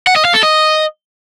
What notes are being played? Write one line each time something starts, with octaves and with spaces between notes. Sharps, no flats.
F#5
D#5
F5
A4
D#5